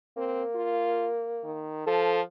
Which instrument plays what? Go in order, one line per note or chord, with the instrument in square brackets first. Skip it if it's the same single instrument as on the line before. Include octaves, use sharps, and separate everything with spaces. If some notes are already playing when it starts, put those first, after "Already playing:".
[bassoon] A#3 [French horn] C4
[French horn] F4
D#3
[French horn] F3 [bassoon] A4